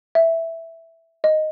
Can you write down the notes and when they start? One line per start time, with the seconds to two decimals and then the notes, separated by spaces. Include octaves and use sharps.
0.15 E5
1.24 D#5